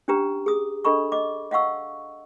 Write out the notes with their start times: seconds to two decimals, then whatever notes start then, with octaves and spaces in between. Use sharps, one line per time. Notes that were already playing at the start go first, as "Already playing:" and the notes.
0.08 C#4 D4 G4 B4 A#5
0.46 G#4 D#6
0.85 D4 A4 D#5 B5 C#6
1.12 D#5 D6
1.51 D#5 F5 F#5 C#6 E6